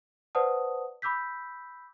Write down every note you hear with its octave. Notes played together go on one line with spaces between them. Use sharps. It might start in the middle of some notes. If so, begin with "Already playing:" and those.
B4 C5 D5 F#5 A5 D#6
B5 D6 E6 G6 B6